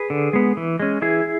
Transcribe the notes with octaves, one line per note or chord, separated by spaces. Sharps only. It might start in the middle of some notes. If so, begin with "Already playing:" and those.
Already playing: G#4 B4
D3
G#3 B3
E3
G#3 C#4
E3 E4 G#4